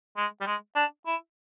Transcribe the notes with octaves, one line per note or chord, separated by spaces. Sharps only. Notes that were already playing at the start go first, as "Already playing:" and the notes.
G#3
G3
G#3
D4
E4